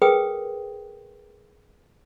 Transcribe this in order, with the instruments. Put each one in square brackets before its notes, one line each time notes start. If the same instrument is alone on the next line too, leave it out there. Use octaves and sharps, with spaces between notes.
[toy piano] G#4 A#4 B4 G5 D#6